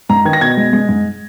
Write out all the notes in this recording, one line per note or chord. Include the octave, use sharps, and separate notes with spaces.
G#2 A#5
D#3 G#6
A#6
B2 G#6
G#3
G#3
G#2